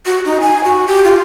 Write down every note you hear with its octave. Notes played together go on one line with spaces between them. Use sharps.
F#4
D#4
G#5
F#4
G4
F4